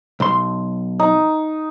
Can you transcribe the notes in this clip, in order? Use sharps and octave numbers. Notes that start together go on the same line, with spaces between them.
B1 C6
D#4